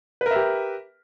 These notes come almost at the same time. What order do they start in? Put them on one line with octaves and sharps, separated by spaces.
B4 A#4 E5 G4